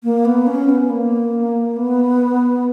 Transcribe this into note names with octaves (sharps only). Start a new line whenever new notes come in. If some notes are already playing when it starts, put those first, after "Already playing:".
A#3
B3
C#4
B3
A#3
B3